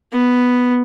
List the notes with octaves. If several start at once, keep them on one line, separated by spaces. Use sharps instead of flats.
B3